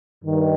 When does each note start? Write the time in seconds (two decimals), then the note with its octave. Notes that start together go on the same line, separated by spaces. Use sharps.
0.24 G2 D#3